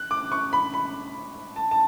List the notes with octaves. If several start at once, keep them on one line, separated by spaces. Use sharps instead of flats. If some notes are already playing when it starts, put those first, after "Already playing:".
Already playing: F#6
D6
C#6
B5
B5
A5
A5